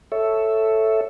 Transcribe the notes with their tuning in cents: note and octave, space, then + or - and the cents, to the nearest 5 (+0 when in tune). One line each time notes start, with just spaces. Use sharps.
A4 +0 C#5 +0 E5 +0